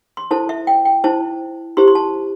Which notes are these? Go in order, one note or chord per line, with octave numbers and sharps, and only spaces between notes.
C6
E4 A4 C5 A5
E5
G5
G5
E4 C5 A5
E4 G4 C5 C6
C6
A5